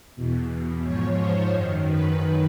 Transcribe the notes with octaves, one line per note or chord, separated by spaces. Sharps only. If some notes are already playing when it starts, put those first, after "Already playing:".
E2 B2
G#2 F3 C#5
C5
F#2 D#3
B4